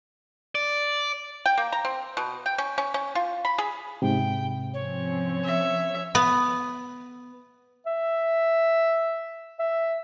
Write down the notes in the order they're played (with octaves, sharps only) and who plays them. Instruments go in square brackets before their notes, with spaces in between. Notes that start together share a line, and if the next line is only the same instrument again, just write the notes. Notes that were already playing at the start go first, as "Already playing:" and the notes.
[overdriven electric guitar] D5
[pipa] G5
A#3
A#5
C4
B2
G5
C#4
C#4
C#4
F4
B5
G#4
[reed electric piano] G#2 C3 [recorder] G5
[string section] F3 C4 C#4 [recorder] C#5
[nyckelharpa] E5
[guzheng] B3
[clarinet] E5
E5